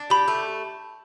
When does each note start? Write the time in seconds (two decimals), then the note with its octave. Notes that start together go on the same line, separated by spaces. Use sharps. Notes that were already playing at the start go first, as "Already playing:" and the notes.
Already playing: D4
0.10 G4 B5
0.28 A3